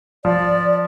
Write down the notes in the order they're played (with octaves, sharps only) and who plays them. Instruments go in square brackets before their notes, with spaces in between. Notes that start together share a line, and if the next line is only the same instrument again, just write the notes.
[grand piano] F3 [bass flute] D5